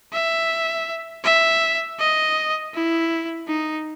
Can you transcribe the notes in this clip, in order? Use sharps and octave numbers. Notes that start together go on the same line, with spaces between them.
E5
E5
D#5
E4
D#4